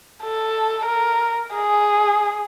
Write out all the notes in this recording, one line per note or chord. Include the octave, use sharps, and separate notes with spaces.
A4
A#4
G#4